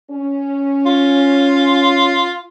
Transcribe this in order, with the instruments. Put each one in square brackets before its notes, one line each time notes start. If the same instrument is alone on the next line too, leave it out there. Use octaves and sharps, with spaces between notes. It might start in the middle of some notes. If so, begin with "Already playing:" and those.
[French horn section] C#4
[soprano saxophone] F4